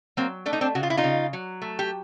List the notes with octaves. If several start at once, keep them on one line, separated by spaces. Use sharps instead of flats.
F#3 A#3 C4
A3 D4
D#4
C4 D4
C#3 F#4
F4
E4
D#4 F4
C#3
F#3
A3
G4